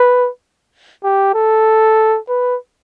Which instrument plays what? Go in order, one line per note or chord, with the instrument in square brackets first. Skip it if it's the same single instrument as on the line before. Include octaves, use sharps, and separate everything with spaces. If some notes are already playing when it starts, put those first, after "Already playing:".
Already playing: [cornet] B4
G4
A4
B4